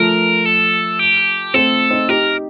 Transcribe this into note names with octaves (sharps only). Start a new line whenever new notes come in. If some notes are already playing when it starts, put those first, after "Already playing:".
Already playing: F3 A3 A#4
A4
G4
A3 C4 A4
C4 D#4
D#4 G4 A#4